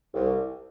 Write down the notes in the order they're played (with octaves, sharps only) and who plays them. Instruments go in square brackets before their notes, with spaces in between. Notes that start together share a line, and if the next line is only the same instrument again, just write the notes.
[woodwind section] C2